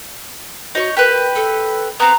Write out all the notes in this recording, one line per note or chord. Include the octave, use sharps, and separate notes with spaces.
D#4 F#4 C#5
G4 A#4 B4
A4
B3 C4 A#5